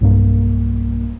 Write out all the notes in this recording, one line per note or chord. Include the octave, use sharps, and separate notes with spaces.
B1 G2 A#3